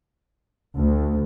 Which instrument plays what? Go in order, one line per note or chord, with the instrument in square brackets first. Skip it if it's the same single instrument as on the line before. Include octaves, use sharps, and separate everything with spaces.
[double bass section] D2